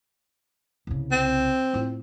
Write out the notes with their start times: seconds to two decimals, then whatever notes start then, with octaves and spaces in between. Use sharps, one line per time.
0.87 C2 C#3
1.11 C4
1.73 A2 F4